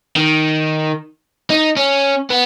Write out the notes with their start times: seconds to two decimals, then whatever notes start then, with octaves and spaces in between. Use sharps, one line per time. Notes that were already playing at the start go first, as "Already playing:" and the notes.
0.16 D#3
1.50 D#4
1.77 C#4
2.30 B3